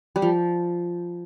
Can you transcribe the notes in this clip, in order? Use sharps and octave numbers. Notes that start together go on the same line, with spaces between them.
G3
F3